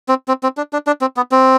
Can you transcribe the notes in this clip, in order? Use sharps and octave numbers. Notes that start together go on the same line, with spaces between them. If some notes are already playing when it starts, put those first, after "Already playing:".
C4
C4
C4
D4
D4
D4
C4
B3
C4